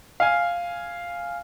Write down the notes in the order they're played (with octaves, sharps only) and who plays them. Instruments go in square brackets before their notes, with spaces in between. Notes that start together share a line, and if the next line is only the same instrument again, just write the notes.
[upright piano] F5 G#5